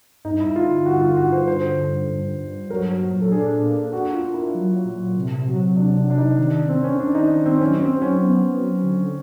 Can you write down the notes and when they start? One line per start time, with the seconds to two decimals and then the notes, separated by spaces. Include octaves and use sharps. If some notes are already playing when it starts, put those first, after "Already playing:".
0.24 G2 D#4
0.40 E4
0.56 D3 F4
0.86 G2 F#4
1.01 F4
1.17 G2 F#4
1.32 C5
1.47 D3 C5
1.78 G2
2.09 G2
2.39 G2
2.70 F#3 A#4
3.00 A#2
3.21 A4
3.31 D4 G#4
3.63 A#3
3.93 D4 F#4
4.13 F4
4.23 A#3
4.34 E4
4.54 F#3
4.85 A#2
5.16 C3
5.46 F#3
5.77 C3 D4
5.97 D4
6.07 C3 D4
6.18 D#4
6.38 D#3 D4
6.68 D#3 C4
6.84 C#4
6.99 D#3 D4
7.15 D#4
7.31 D#3
7.46 C4
7.61 F#3 C#4
7.81 C4
7.92 F#3
8.02 C#4
8.23 B3
8.53 F#3
8.83 D3